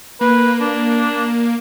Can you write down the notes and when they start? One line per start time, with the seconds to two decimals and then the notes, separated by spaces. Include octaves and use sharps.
0.21 A#3 B4
0.61 D4